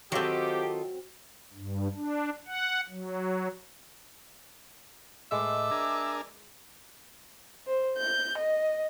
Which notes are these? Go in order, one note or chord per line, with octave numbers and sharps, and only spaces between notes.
D#3 F#3 C4 F4 G4 A4
G2
D4
F#5
F#3
A2 G#3 B4 E5 D6
D4 G#4 A#4
C5
G6
D#5